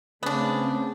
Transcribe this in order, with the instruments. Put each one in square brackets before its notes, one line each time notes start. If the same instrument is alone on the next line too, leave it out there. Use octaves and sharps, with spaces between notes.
[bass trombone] C#3 [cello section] A3 C4 [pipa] B3 D4